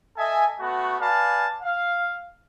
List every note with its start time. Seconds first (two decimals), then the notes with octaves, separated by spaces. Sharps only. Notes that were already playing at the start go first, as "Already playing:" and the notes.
0.17 A4 D#5 E5 G#5
0.58 A3 B3 F#4
1.00 B4 D5 F5 G#5 A5
1.62 F5